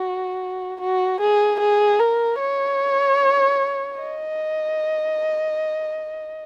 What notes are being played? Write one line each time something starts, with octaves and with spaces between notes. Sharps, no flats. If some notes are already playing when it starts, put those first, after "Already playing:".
Already playing: F#4
F#4
G#4
G#4
A#4
C#5
D#5